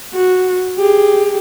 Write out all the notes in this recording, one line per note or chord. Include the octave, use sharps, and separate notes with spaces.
F#4
G4 G#4